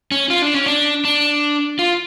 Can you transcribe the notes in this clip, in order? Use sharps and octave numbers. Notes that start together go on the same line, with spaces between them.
C#4
F4
D4
C#4
D4
D4
F4